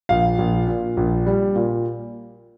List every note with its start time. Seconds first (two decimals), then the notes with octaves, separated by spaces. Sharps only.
0.09 A#1 F5
0.39 A#1
0.68 A#2
0.97 A#1
1.26 G3
1.56 A#2